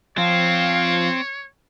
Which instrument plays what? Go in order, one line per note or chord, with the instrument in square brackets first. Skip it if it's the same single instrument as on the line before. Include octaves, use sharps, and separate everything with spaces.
[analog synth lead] F3 [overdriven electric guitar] C4 [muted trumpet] C#5 [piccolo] F5